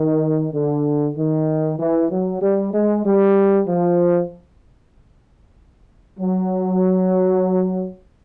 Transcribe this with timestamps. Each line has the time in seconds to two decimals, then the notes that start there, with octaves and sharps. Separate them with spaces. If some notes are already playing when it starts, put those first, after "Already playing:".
Already playing: D#3
0.53 D3
1.17 D#3
1.79 E3
2.11 F#3
2.42 G3
2.74 G#3
3.04 G3
3.68 F3
6.19 F#3